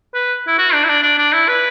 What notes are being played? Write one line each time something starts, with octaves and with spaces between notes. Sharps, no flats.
B4
E4
F#4
D4
E4
D4
D4
D4
E4
B4